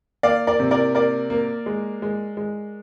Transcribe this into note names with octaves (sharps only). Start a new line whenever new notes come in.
A#3 D5 F5
A#4 D5
C3
A#4 D5
A#3 A#4 D5
A#3
G#3
G#3
G#3